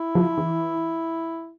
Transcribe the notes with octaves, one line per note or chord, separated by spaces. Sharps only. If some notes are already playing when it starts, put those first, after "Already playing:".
Already playing: E4
F3
E3